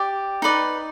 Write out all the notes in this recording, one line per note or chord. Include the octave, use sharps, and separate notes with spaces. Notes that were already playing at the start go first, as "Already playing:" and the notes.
Already playing: G4 D5
D#4 B4 D5